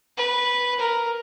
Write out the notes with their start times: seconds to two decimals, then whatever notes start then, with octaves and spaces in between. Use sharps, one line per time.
0.17 B4
0.79 A#4